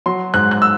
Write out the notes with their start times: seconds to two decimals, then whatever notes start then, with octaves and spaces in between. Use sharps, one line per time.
0.06 F#3 C6
0.34 G#2 F#6
0.51 F#6
0.62 E6